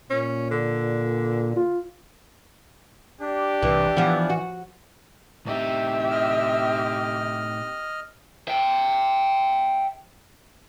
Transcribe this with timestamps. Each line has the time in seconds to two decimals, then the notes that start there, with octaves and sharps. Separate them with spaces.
0.10 A#2 C#4
0.51 D3
1.57 F4
3.21 D4 G4
3.63 C2 E3
3.97 E3 F3 B3
4.29 F#4
5.46 A2 C4 D#4 G4 E5
6.11 D#5 F6
8.48 E5 G5